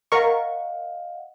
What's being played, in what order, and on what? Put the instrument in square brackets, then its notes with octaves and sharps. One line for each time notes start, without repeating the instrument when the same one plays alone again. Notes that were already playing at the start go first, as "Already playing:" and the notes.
[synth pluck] A#4 C#6 [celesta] D#5 F5 F#5